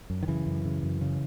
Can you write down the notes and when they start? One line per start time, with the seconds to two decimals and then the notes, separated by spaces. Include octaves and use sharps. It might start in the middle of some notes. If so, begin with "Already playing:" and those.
0.10 F#2
0.23 D#3
0.28 C#3 E3
0.46 F#2
0.65 C#3
0.83 F#2
1.01 C#3